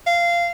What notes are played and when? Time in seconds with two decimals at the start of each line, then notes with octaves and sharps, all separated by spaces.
0.07 F5